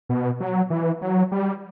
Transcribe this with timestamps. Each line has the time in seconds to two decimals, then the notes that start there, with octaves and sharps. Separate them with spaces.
0.09 B2
0.40 F#3
0.70 E3
1.01 F#3
1.32 G3